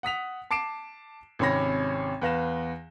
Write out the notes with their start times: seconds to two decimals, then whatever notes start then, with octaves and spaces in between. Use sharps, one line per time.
0.03 F#5 D#6 B6 F7
0.51 A5 D6 C7 D7 E7
1.39 G#1 C3 C#4 C#5 B5 A#6
2.22 E2 B4 F5 A#6 E7